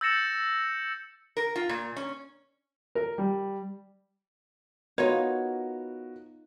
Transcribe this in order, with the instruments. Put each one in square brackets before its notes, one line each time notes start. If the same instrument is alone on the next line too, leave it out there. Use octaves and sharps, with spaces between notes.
[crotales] E6 G6 A6 A#6 C#7 E7
[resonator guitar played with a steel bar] A#4
F4
A#2
C#4
[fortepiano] A#4
G3
[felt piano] B3 F#4 A#4 [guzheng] D#4 F4 [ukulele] C#5